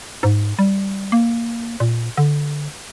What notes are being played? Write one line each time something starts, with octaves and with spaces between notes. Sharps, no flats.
G#2
G3
A#3
A#2
D3